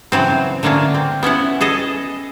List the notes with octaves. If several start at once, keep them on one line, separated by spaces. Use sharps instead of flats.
C#3 E3 F#3 C4
D3 A3 A#3 C#4 D4
C4
B3 C#4 E4 F#5
G#4 A4 D#5